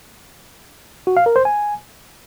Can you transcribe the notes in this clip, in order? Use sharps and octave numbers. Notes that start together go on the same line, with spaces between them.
F#4
F5
A#4
C5
G#5